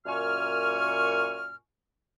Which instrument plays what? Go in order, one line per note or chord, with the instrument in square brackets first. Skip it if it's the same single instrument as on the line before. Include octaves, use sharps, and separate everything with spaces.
[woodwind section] F#2 A#2 G#5 C#6 F6